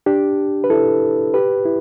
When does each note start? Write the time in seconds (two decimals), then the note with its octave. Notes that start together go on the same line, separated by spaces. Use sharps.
0.06 D4 G4
0.64 B4
0.70 E4 A4
1.34 G4 B4
1.65 E4